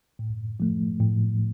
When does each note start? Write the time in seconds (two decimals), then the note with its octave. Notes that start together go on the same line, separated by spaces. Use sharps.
0.19 A2
0.60 F3 A3
1.01 A2